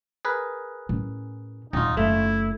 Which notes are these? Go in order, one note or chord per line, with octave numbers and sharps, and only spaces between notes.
G#4 A#4 B4
A2 C#4
D#1 G#1 D#4 F4
F#1 A3 E4